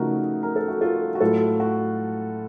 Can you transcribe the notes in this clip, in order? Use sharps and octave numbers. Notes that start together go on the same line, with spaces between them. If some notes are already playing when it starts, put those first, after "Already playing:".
Already playing: C#3 F3 A3 D#4 F#4 A#4
A#4
A4
F#4
F4 A4
F#4
A2 F#3 A3 F4 A4
F#4